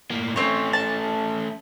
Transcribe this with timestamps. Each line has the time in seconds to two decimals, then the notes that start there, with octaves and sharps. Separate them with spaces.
0.11 A2 A#3
0.36 A3 C4 C#4 C#5
0.73 A5